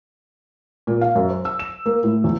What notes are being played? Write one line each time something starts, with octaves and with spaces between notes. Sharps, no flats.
A#2
F5
F#2
C5
E6
E7
A#3
A2
E2